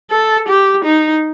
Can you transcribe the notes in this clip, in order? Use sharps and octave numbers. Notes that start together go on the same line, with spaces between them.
A4
G4
D#4